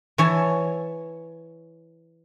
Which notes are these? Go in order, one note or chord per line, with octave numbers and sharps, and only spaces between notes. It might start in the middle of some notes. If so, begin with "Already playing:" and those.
E3 C#5 G#5 A5